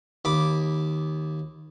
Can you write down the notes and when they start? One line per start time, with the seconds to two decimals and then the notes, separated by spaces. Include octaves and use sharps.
0.25 D#2 B5 D6